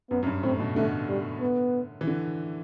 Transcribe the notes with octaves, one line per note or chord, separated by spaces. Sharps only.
F#2 B3
F#2
G2
A2 C4
B2
D3 A3
G3
B3
E3
D3